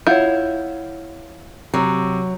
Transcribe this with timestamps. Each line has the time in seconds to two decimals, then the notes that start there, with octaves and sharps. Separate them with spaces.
0.07 E4 F4 C#5 F#5 G6
1.74 C3 F#3